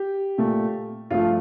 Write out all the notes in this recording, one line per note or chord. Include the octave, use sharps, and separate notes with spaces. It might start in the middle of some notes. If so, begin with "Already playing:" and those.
Already playing: G4
A#2 A3
G2 F3 A3 F4